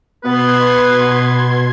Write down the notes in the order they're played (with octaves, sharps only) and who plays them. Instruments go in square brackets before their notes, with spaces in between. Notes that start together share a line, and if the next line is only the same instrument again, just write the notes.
[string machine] B2 C6 G#6 [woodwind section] B3 B4